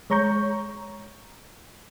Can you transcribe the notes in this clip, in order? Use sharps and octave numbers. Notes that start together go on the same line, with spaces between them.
G#3 C#5 A#5 C#6 G6